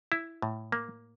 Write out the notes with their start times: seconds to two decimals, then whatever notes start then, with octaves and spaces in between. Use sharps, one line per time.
0.12 E4
0.42 A2
0.72 A#3